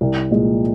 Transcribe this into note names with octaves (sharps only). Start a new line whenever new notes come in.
C2
A#2 F3 G#3